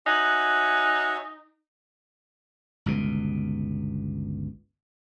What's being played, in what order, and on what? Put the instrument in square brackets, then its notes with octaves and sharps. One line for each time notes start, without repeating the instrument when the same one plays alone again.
[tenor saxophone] D#4 [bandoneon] F#4 C#5 E5 [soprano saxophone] G#5 [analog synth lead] F#6
[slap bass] G1 C#2 B2